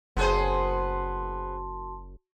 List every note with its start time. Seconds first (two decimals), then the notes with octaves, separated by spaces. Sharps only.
0.17 F#1 B3 F#4 G#4 C5 A5 C6